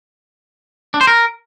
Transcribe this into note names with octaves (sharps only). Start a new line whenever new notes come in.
D4
C5
A#4